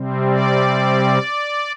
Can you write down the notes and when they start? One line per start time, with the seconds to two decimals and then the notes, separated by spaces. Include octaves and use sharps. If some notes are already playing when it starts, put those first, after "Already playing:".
Already playing: C3 G3 C4
0.28 D5